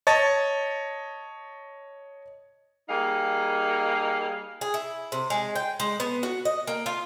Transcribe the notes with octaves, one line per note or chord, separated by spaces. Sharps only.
C#5 D#5 A5 A6
G3 A#3 D#4 G#4 F5
G#4
E4
C3
G#3
G5
G#3
B3
F#4
D#5
A#3
F4